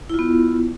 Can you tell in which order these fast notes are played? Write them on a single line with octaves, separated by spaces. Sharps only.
E4 F4 B3